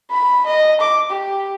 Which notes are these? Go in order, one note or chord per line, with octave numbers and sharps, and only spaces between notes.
B5
D#5
D6
G4